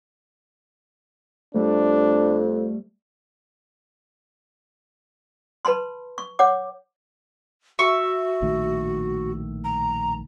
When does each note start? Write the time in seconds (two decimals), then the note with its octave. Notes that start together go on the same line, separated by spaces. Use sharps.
1.55 F2 G3 A3 D4
5.65 B4 A5 B5 C6
6.18 C#6
6.39 C#5 F#5 D6
7.79 F#4 E5 C#6
8.42 A#1 A2 D#3
9.64 A#5